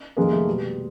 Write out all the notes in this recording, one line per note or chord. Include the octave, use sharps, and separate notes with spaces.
F2 C3 D#3 G3 G#3 A#3
A3
C2 B2 G3